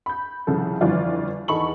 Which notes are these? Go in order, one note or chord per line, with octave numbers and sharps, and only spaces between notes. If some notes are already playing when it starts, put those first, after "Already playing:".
B5 G6
C2 C#3 F3 A4
G1 F2 E3 F4 D5
E2 D#4 A4 B5 C#6 F#7